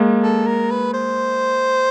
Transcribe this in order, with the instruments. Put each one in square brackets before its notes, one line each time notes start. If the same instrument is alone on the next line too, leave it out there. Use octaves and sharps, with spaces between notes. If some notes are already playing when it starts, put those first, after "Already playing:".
Already playing: [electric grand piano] G#3 A#3
[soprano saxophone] A4
A#4
B4
C5